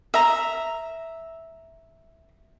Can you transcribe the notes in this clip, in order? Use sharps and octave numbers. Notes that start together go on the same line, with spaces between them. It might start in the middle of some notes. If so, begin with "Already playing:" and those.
E5 A#5